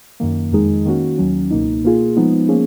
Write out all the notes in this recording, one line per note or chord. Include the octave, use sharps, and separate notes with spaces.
F#2 D#3 A#3
F2 D#3 G#3 D#4 G#4
D#3 A#3 C#4 F#4
D#2 D#3 F#3 C#4
C#2 B2 A#3 D#4
B2 A#3 F4 G#4
F3 G#3 B3 D#4
F3 A#3 C#4 G#4